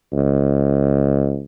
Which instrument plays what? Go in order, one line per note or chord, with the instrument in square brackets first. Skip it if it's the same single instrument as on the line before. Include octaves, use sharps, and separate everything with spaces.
[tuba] C#2